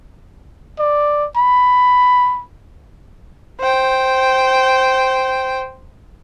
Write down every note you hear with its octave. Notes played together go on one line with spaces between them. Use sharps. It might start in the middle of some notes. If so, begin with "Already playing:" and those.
D5
B5
C5 G5